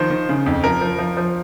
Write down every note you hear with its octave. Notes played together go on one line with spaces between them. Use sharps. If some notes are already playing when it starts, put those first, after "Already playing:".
Already playing: D#3 F3 C5
D#3
C#3
F2
F3 A#4
F3
F3
F3